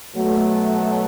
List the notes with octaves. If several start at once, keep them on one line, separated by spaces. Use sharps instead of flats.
B2 F#3 A3